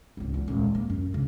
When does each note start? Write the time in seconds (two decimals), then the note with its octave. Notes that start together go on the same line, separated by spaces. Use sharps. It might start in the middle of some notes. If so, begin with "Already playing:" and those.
0.17 G#1 C#2
0.34 E1 E2
0.48 D#1 G#3
0.75 A#3
0.90 F#2
1.13 G2 C#3